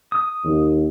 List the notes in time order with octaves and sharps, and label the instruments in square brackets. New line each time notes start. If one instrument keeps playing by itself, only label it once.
[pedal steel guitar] D#6
[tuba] D#2